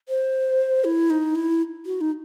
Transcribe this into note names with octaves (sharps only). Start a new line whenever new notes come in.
C5
E4
D#4
E4
F#4
D#4